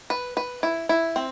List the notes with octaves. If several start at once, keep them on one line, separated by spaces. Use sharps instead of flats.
B4
B4
E4
E4
C4